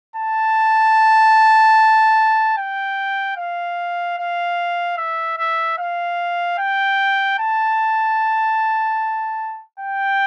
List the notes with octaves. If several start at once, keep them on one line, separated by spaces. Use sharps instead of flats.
A5
G5
F5
F5
E5
E5
F5
G5
A5
G5